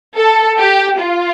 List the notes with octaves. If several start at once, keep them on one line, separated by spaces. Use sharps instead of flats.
A4
G4
F4